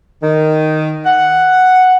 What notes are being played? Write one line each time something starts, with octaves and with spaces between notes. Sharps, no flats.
D#3
F#5